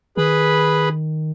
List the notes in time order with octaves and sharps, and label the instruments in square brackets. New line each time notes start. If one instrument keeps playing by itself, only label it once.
[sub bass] D#3 [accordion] G#4 B4 B5